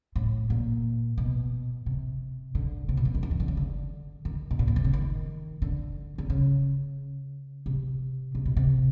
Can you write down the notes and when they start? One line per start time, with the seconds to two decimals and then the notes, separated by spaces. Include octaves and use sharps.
0.16 A2
0.50 A#2
1.18 B2
1.86 C3
2.55 D3
2.89 C3
2.97 B2
3.05 E3
3.15 D#3
3.23 E3
3.31 D#3
3.40 D3
3.48 C#3
3.57 D3
4.25 D#3
4.51 B2
4.59 A#2
4.68 B2
4.76 C3
4.84 C#3
4.93 D#3
5.62 D3
6.18 D3
6.30 C#3
7.66 C3
8.35 C3
8.45 B2
8.57 C3